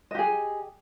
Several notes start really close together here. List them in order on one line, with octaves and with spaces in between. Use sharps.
D#5 G4 G#4